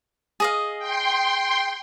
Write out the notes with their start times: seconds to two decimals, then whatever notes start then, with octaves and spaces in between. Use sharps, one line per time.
0.40 G#4 D#5 F5
0.79 G5 C6